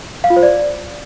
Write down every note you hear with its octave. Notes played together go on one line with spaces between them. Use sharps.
F5
F4
C5
D5